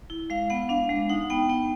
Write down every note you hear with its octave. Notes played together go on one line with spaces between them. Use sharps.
E4
G#3 F5
B3 F#5
D4 F5
G#3
D#4 F#5
B3 G5
B3 G5